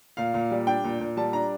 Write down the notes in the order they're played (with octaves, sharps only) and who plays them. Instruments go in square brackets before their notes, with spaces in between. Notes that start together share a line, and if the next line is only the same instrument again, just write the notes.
[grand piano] A#2 F5
A#2
G3
D4 G5
A#2
A#2
G3 A5
D4 A#5